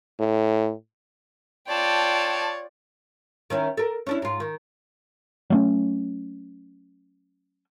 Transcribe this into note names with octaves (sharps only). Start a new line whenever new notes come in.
A2
F4 C#5 D5 G5 A5
D#3 C#4 E4
A4 A#4
C#4 D4 E4
G#2 F4
D#3
F#3 A3 C#4